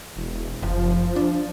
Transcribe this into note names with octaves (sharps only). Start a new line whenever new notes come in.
E1
F#1 F3
D4